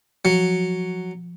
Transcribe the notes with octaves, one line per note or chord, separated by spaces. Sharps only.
F3 F#3